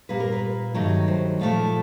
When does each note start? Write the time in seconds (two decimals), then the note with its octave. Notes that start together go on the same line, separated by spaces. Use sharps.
0.09 A#2 G3 A#3 B4
0.20 A#4
0.32 B4
0.74 G2 D#3 F#3 A3
1.08 C5
1.41 A#2 F3 A3